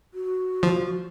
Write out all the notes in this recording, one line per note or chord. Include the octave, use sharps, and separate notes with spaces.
F#4
F3